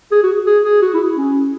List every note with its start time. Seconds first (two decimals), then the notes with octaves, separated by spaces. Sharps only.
0.11 G#4
0.23 F#4
0.46 G#4
0.64 G#4
0.82 F#4
0.94 E4
1.17 C#4